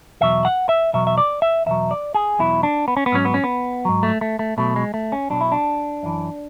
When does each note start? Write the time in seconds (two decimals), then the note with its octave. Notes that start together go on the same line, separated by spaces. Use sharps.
0.21 E2 B2 F#3 E5
0.45 F#5
0.69 E5
0.93 E2 B2 F#3 E5
1.07 E5
1.18 D5
1.42 E5
1.66 E2 B2 F#3 E5
1.91 D5
2.14 G#4
2.39 E2 B2 F#3 E4
2.63 D4
2.88 B3
2.97 C#4
3.06 B3
3.12 G#2 F#3 C#4
3.25 B3
3.34 C#4
3.44 B3
3.85 G#2 F#3
4.03 A3
4.21 A3
4.39 A3
4.57 B1 B2 F#3 A3
4.76 G#3
4.94 A3
5.12 C#4
5.30 B1 B2 F#3 D4
5.41 E4
5.52 D4
6.03 F#2 E3